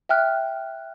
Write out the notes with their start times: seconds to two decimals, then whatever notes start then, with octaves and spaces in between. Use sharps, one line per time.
0.09 E5 G5 F6 F#6